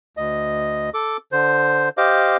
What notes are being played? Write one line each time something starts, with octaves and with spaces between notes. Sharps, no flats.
D2 D#5
A4 D6
D3 C5
G4 C5 D#5 F5 D6